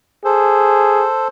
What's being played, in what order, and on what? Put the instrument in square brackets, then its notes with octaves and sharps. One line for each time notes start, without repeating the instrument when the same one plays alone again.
[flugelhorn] G#4 [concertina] A4 C5